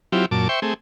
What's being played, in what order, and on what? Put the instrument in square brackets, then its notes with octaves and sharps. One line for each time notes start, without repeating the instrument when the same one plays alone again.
[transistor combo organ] F#3 C4 E4 F4 G4
F#2 A#2 A5 D6
C5 E5 G5 C#6
A3 C4 G#4